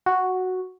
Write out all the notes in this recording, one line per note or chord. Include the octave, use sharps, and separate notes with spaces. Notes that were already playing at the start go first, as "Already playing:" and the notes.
F#4